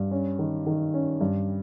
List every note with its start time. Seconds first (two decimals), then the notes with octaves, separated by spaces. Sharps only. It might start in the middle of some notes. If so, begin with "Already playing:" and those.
Already playing: G2
0.11 C#4
0.39 D#3
0.66 D#3
0.94 C#4
1.21 G2